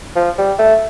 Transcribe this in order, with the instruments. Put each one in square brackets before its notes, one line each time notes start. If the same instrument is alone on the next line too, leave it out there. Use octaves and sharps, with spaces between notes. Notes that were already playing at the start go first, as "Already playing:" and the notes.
[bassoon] F3
G3
A3